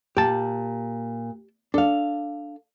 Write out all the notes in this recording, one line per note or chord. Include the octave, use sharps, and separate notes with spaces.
A#2 G4 A5
D4 A4 F5